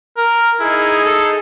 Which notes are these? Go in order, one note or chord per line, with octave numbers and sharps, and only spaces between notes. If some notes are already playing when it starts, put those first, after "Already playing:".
A#4
D#4 E4 G#4
A4